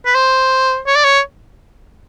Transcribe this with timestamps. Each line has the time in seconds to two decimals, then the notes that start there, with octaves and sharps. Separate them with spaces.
0.06 B4
0.15 C5
0.87 C#5
0.96 D5
1.04 C#5